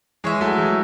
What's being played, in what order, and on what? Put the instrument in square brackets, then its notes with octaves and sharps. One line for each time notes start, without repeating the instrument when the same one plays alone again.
[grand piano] E3 G#3 [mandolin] G#4 C#5 E5
[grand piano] F#3 A3
E3 G#3